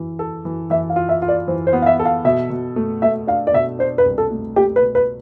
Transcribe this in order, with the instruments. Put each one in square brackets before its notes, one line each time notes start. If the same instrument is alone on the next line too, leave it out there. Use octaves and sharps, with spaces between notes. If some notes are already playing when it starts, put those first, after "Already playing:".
Already playing: [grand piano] E3
A4
E3
[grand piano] E3 [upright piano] E5
[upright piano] F5
[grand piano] F4
[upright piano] E5
[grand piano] F4
[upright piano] D5
[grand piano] E3 [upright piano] C5
[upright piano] C5
[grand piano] B3
[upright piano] F5
E5
[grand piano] A4
[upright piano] F5
[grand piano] B2 [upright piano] E5
[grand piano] B2
A3
[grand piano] A3 [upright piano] E5
[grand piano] D4 [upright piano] F5
[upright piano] D5
[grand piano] B2 [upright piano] E5
[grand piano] D4 [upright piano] C5
[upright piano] B4
[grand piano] C2
[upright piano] A4
[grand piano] A3
[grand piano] A3 [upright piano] G4
[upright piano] B4
[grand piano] B2
[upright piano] B4